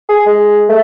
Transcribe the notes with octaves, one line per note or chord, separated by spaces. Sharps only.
G#4
G#3
A3